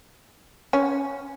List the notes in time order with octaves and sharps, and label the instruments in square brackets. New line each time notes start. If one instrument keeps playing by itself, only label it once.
[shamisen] C#4